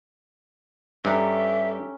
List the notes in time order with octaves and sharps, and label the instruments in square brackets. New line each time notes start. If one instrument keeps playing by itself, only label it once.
[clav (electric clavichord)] G2 [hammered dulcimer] C#4 A#5 [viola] G4 A4 [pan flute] E5